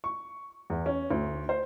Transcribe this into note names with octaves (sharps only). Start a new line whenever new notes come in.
C#6
E2
C#4
D2
C5